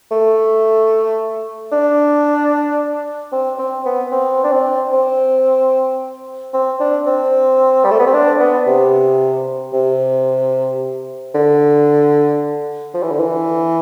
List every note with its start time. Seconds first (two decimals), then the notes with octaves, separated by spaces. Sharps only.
0.11 A3
1.72 D4
3.32 C4
3.59 C4
3.86 B3
4.12 C4
4.44 D4
4.52 C4
4.93 C4
6.54 C4
6.80 D4
7.06 C4
7.85 G3
7.91 A3
7.99 B3
8.07 C4
8.14 D4
8.40 B3
8.67 C3
9.73 C3
11.35 D3
12.94 F3
13.03 E3
13.11 D3
13.20 E3